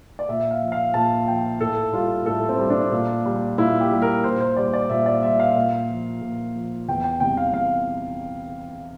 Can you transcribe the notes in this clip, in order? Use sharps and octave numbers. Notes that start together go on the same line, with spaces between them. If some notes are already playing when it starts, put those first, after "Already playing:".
D5
A#2 E5
F5
F3
F5
A#2 A5
F3 G5
A2 A4
G3 F4
A2 A4
C4
G3
D4
A#2
G3
A#2 E4
G4
G3
A#4
A#2 C5
C5
G3 D5
D5
A#2 E5
D5
G3 E5
F5
A#2
F3
A#2
F3
E2 G5
G5
C3 E3 G3 G5
F5
E2 F5